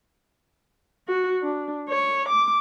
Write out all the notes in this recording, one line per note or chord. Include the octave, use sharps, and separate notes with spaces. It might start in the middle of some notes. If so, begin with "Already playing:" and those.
F#4
D4
C#5
D6